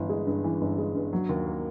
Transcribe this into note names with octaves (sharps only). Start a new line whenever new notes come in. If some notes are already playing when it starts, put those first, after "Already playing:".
Already playing: G1 E3
G#3
G2
E3
G1
G#3
G2
F#3
D#2
A#3